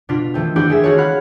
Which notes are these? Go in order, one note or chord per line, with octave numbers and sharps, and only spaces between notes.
B2 D4 F4 B6
D#3 E3 A3 C4
C4 D4 E4 F#4 G4 D5
D#3 G#3 G#4 E5
F4 F#4 A4 C#5
F5 F#5 B5 F6 F#6